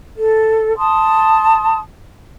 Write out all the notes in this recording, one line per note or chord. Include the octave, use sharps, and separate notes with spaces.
A4
A5 C6 D#6